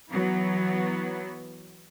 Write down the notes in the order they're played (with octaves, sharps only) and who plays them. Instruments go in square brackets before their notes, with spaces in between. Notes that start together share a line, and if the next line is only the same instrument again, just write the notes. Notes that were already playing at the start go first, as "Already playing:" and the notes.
[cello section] E3 F#3 B3